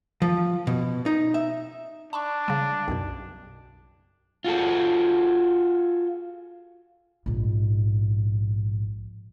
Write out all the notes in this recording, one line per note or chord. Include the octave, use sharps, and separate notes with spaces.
F3
B2
D#4
E5
D4 A5 B5 C#6
C#3 G3
B1 F#2 B2
F4 F#4 G#4 A4
A#1 G#2